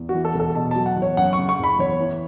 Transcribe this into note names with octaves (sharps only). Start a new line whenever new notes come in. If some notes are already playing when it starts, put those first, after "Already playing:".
Already playing: E2
F#4
E3
A4
E1 A4
B2 A5
F#3 A5
F#5
E2
C#5
F#2 F#5
C#6
C#3
C#6
F#1 B5
E2 C#5
E3